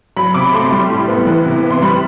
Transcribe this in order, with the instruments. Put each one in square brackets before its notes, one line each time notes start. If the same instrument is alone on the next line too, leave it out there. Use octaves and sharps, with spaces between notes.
[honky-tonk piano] F#3 B5
C3 D6
A3 C6
G3
A2
B3
E3
C3
B3
C6
G3 B5